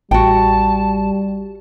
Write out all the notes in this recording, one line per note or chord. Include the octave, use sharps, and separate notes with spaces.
A1 G3 F#4 G5 A5